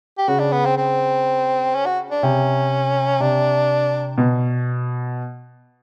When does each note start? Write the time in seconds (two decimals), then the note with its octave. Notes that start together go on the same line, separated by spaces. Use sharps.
0.18 G4
0.28 C#3 F#4
0.40 D4
0.52 B3
0.65 C4
0.77 C4
1.75 C#4
1.86 F#4
2.11 D4
2.23 C3 C#4
3.20 C3 D4
4.18 B2